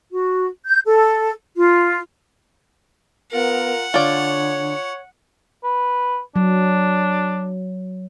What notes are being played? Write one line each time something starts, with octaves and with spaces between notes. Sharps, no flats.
F#4
G6
A4
F4
B3 F4 A#4 F#5
D3 F4 C#5 D5
B4
F#3 D4